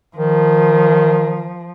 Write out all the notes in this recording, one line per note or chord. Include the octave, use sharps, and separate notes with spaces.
D#3 F3